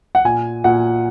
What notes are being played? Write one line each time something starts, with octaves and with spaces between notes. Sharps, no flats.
F#5
A#2 G#5
A#2 F#5